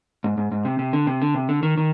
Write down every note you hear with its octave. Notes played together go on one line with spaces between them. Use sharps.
G#2
G#2
G#2
C3
C3
D3
C3
D3
C3
D3
D#3
D#3